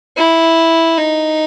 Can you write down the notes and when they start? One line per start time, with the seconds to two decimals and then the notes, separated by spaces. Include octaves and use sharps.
0.17 E4
0.97 D#4